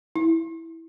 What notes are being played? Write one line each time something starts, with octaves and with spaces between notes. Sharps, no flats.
E4